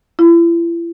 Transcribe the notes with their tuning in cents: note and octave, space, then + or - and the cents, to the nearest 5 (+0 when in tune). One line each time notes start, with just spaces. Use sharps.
E4 +40